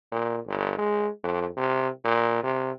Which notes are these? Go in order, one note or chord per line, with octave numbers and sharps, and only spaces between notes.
A#2
G1
G#3
F2
C3
A#2
C3